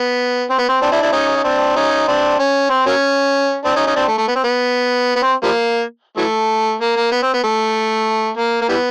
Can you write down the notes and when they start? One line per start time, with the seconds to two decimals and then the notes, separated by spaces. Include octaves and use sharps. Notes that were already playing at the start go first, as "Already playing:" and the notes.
Already playing: B3
0.50 C4
0.58 B3
0.69 C4
0.82 C4 D4
0.92 D4 E4
1.02 D4 E4
1.12 C#4 D#4
1.36 D#4
1.44 C4 D4
1.76 C#4 D#4
2.07 C4 D4
2.39 C#4
2.70 C4
2.86 F#3 A#3 C#4
3.65 C4 D4
3.76 C#4 D#4
3.87 C#4 D#4
3.96 C4 D4
4.07 A3
4.18 A3
4.28 B3
4.36 C4
4.44 B3
5.16 B3
5.23 C4
5.43 F3 G3 A#3
6.17 E3 F#3 A3
6.81 A#3
6.97 A#3
7.12 B3
7.22 C4
7.33 B3
7.44 A3
8.37 A#3
8.62 A#3
8.69 E3 G3 B3